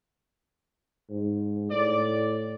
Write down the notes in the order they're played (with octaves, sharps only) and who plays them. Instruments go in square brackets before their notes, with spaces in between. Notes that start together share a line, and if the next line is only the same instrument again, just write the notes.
[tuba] G#2
[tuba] A2 [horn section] D5